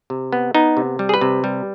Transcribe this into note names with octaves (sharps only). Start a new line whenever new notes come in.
C3
B3
B3 D#4
C3
G3
G#4
B4
C3
G3